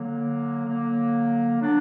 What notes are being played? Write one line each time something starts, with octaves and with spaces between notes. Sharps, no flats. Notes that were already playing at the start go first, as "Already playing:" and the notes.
Already playing: D3 F#3 A#3
D3 F#3 A#3
F#3 B3 D4